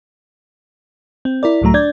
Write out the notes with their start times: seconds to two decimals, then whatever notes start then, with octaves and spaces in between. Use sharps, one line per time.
1.25 C4
1.43 E4 A#4 D5
1.62 C#2 A2 F#3 A3 A#5
1.74 D4 D5 G6 G#6